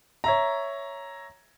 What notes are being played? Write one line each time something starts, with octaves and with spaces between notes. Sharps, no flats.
C#5 E5 A#5